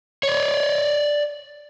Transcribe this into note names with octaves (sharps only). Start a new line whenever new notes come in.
C#5 D5